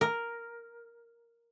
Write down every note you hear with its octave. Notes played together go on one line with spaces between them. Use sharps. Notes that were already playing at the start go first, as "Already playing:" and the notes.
A#4